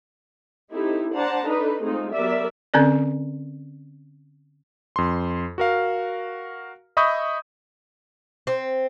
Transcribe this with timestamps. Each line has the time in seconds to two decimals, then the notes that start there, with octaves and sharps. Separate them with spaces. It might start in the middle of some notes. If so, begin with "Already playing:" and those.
0.72 C4 D#4 E4 G4 A4
1.13 D4 C5 D5 F#5 A5 A#5
1.47 D4 D#4 A4 B4 D#5
1.83 G#3 A3 C4 D#4 F4 G#4
2.12 F#3 B3 G4 A#4 D5 E5
2.74 D3 C4 C#4 A4 D5
4.96 F2 C6
5.58 F#4 A#4 F5
6.97 D#5 E5 B5 C#6 D#6 G6
8.47 C4